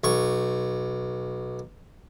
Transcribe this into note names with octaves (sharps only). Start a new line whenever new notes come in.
B1 C#6